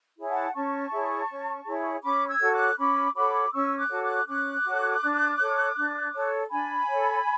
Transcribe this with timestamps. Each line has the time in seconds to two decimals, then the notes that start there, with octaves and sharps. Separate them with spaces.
0.17 E4 G#4 C#5
0.29 F#5 A5
0.54 C#4 A5 C#6
0.91 E4 G#4 C#5
1.29 C#4
1.66 E4 G#4 C#5
2.03 C#4 B5 D6
2.28 E6 G#6
2.40 F#4 A4 C#5
2.53 D6 F#6
2.78 C#4 B5 D6
3.15 F#4 A4 C#5 B5 D6
3.52 C#4 C#6 E6
3.77 D6 F#6
3.90 F#4 A4 C#5
4.02 D6 F#6
4.27 C#4 D6 F#6
4.65 F#4 A4 C#5
5.02 D4
5.39 A4 C#5
5.76 D4
6.14 A4 C#5
6.51 D4 G#5 B5
6.89 A4 C#5